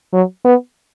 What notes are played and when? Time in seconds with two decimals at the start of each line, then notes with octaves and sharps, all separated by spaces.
0.13 F#3
0.45 B3